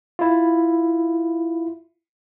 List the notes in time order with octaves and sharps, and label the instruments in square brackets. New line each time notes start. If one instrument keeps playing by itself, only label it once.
[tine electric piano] E4 F4